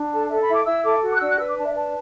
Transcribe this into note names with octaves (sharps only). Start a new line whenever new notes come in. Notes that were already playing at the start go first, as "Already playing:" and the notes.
Already playing: D4
A4 A5
A4 E5
B5
E4
D6
E4 E6
A4 D6
F#4
D6
F#6
D4 E6
F#6
B4 E6
D6
D4 A5
E5
B4 A5